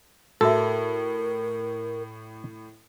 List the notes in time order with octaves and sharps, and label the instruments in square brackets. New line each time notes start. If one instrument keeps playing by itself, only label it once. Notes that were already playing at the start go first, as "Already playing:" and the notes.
[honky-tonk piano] A2 [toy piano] F#4 E5 [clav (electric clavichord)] A4 [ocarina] A#4